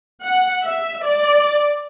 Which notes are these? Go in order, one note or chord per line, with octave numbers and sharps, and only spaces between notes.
F#5
E5
D5